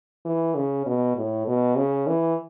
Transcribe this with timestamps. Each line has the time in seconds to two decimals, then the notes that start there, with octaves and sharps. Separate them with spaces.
0.25 E3
0.55 C#3
0.86 B2
1.16 A2
1.47 B2
1.77 C#3
2.07 E3